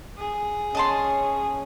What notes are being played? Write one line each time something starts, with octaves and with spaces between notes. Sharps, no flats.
G#4
C#4 D#5 A5 C6